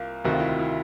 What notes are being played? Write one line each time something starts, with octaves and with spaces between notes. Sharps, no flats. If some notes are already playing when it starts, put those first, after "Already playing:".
Already playing: C2 A#3 F4
D2 C3 D#3 F#4
F4
E4
F4
E4